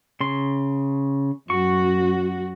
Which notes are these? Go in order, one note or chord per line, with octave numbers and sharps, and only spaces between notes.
C#3 C6
F#2 F#4 C#6